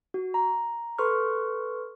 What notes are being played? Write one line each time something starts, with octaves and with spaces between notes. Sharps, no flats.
F#4
A#5
A4 B4 C6 C#6 F6